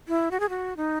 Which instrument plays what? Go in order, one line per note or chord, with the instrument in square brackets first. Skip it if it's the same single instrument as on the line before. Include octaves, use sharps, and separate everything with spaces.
[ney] E4
F#4
G#4
F#4
D#4